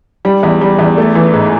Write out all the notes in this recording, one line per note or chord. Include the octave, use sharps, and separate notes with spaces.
G3
E2
G3
E2
A3
E3
G#2